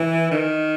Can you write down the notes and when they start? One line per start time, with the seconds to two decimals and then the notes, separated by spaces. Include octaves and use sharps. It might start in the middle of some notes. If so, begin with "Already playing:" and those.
Already playing: E3
0.32 D#3